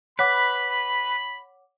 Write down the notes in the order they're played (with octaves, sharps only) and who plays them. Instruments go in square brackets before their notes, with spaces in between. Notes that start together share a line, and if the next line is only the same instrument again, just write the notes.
[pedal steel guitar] B4 [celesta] C#5 F#5 D6 [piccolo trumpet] B5